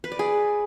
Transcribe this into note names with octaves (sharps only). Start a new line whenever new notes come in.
B4
D5
G#4